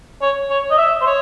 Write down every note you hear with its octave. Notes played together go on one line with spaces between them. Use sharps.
C#5
C#5
D#5
E5
C5
C#5